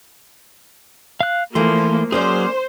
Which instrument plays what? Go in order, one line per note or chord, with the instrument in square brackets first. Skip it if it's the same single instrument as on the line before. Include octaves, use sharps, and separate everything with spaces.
[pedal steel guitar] F5 F#6
[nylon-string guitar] E3 A3 [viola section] F3 A#3 [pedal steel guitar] C6
[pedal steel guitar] F#3 G#4 [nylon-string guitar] A#3 C#4 D5 [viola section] C5